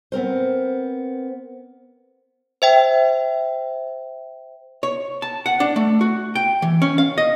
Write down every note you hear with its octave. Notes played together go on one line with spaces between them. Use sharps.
B3 C4 A#4 C5
C5 E5 G5
C#5
A5
F#5
D4
A3
F#4
G5
E3
C#4
F5
D#5